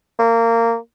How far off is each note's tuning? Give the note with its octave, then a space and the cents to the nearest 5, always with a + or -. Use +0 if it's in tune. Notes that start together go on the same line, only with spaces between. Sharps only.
A#3 -20